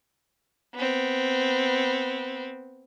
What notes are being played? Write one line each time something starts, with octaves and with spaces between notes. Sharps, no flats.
B3 C4